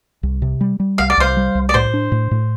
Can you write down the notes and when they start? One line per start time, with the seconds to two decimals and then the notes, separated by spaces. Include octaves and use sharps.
0.23 C2
0.42 C3
0.61 G3
0.80 G3
0.98 C2 F5
1.10 D5
1.18 C2 C5 F5
1.37 G3
1.55 C2
1.69 D5
1.74 A2 C5
1.94 D4
2.12 A2
2.31 A2